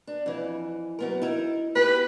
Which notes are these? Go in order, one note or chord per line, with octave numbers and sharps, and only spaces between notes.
D4
F2 E3
F#2 B3 A#4
D#4 E4 A#4
B3 G4 B4